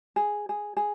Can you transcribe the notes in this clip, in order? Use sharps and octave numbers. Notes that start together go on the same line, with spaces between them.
G#4
G#4
G#4